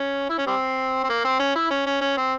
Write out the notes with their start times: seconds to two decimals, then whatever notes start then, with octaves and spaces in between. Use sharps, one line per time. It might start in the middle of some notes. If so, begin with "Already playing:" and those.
Already playing: C#4
0.29 E4
0.38 C#4
0.47 G3 C4
1.04 C4
1.09 A#3
1.24 C4
1.39 C#4
1.56 E4
1.70 C#4
1.86 C#4
2.01 C#4
2.17 C4